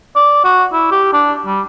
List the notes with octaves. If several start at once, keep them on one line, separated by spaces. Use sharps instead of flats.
D5
F#4
E4
G4
D4
G3